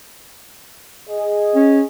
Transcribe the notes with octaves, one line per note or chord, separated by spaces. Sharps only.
G#4 D#5
C#4